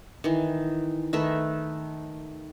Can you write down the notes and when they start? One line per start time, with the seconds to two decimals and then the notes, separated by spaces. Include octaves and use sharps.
0.24 D#3 E3
1.13 D#3 A3 B4 E5